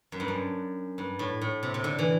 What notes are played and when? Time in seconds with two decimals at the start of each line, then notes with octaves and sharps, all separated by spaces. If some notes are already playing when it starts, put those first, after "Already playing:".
0.12 F#2
0.20 G2
0.28 F#2
0.98 G2
1.19 A2
1.41 A2
1.63 C3
1.74 C3
1.84 D3
1.99 E3